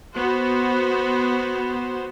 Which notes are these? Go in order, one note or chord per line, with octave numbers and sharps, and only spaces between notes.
B3 F#4 C5